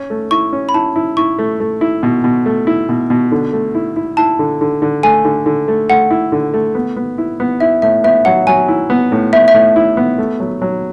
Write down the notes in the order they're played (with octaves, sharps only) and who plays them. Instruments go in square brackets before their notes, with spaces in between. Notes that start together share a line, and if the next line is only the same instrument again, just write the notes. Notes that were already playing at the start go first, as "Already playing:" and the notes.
Already playing: [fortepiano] C#4
A3
[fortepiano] E4 [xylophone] C#6
[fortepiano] C#4
[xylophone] B5
[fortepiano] E4 [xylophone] A5
[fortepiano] E4
[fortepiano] E4 [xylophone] C#6
[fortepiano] A3
A3
E4
B2
B2
A3
E4
B2
B2
D3
A3
E4
E4
[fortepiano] E4 [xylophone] A5
[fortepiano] D3
D3
D3
[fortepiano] A3 [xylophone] G#5
[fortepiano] D3
D3
A3
[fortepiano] A3 [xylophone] F#5
[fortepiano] E4
D3
A3
B3
B3
E4
B3
[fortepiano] E4 [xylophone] E5
[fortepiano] A2 [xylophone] E5
[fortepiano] B3 [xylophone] E5
[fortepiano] F#3 [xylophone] F#5
[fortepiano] F#3 [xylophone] G#5
[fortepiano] E4
B3
A2
[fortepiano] B3 [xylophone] E5
[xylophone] E5
[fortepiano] A2
E4
B3
A3
F#3
F#3